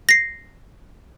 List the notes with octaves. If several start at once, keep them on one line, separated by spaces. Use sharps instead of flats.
A#6 C7